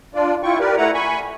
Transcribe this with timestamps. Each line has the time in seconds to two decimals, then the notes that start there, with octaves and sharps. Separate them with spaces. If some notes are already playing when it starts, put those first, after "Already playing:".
0.14 D4 F4 D5
0.43 E4 F4 G5 C#6
0.59 G4 A#4 B4 D5
0.77 A3 E4 B4 F#5 A#5
0.94 G#5 B5 C#6